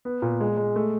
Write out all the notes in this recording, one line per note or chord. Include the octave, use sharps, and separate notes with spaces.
B3
A#2
G#3
G#3
A3